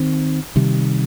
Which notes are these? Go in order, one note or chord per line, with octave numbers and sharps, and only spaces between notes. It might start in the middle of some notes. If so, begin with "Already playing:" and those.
Already playing: D#3 C4
C3 D#3 G3